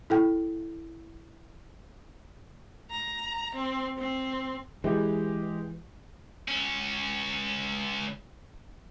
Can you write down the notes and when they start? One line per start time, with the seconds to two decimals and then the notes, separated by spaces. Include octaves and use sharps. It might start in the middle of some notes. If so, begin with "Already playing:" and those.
0.10 E4 A4 G5
2.91 A#5
3.54 C4
3.98 C4
4.84 E3 G#3 G4
6.48 C#2 C#4